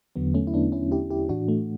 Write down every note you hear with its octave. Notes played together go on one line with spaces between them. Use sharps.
E2 D3 F#3 B3
A3 C#4
E4
B3 D4
C#4 E4
E4 G4
E4 G4
A2 E3 D4 F#4
A3